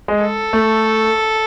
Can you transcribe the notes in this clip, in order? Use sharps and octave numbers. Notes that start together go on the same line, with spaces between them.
G#3
A4
A3